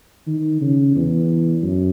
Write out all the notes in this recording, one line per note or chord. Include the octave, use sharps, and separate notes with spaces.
D#3
C#3
E2
F#2